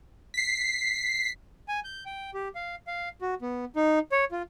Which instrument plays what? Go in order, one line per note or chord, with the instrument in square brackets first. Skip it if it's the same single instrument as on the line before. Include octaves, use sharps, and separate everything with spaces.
[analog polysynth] B6 C7
[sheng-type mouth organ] G#5
G6
G5
G4
F5
F5
F#4
B3
D#4
C#5
F4